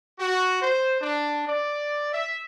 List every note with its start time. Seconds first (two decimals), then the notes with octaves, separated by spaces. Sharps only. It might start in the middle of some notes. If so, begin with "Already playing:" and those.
0.19 F#4
0.61 C5
1.00 D4
1.47 D5
2.13 E5